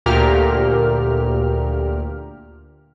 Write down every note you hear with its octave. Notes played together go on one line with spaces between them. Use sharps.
D2 A#2 G4 A#4 F6